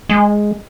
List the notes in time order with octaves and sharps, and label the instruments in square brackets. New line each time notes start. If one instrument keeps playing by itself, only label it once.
[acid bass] G#3